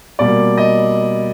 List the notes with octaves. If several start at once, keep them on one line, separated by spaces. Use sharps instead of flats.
B2 G3 A#3 D5
D#5